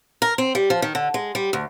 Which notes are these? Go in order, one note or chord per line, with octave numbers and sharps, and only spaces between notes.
A#4
C4
G3
F3
D#3
D3
G#3
G3
D2